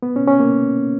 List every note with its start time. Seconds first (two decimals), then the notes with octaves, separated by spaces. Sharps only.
0.03 B3
0.16 C#4
0.28 C#4
0.40 A#3